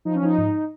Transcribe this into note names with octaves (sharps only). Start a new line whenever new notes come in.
F3 D#4
C#4
F3 D#4
G#2